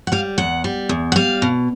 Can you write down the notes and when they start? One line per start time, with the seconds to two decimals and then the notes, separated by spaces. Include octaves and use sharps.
0.07 F#5
0.12 G3 F5
0.38 E2 F#5
0.64 G3
0.89 E2
1.12 F#5
1.16 G3 F5
1.42 B2